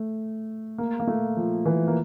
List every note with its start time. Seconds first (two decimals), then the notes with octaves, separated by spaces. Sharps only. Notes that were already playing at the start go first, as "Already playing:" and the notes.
Already playing: A3
0.78 A#3
1.00 A#3
1.07 A3
1.37 F3
1.66 E3
1.87 A#3